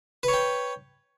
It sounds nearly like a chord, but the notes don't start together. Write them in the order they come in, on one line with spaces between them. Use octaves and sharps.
B4 C#5 G5